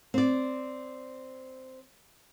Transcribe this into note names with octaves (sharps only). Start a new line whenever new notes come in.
C4 D5